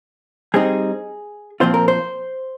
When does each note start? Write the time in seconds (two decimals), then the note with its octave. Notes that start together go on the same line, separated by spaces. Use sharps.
0.54 G3 C4 D#4 G#4
1.60 A#2 F3 C4 F4 C5
1.74 A#4
1.88 C5